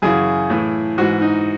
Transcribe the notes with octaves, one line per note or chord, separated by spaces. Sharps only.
F#2 C#3 E3 G#4
A2 E3
G#2 E3 F#4
D#4